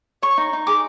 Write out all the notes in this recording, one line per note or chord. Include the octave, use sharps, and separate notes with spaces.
C#5 C#6
D#4
D#4
G#4 D6